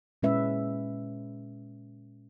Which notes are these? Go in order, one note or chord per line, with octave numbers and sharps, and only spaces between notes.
A#2 G#3 C#4 B4 E5